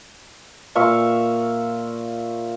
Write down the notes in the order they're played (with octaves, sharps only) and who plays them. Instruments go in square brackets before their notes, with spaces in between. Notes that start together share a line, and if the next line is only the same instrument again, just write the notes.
[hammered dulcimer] A#2 E5 F5 C#6